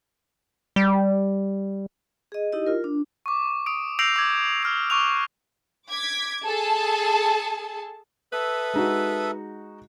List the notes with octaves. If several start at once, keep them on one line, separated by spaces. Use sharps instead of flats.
G3
G#4 D#5
D#4 E4 G4 D#5
F4 A#4
D4
C#6 D6
D#6 D7
E6 G6 A#6 C7 D7 F7
D6 G#6
D#6 F6 F7
C#6 D6 F#6 F7
D6 G#6 B6
G#4 A4 A5
A4 B4 E5 D#6
G#3 D#4 F#4